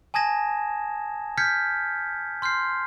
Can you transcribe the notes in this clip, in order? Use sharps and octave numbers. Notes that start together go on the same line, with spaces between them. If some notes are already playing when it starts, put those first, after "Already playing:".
G#5 A5 D#6 G#6 A#6 E7
F6 G6 G#6 B6 C#7
C6 F6 G6 C7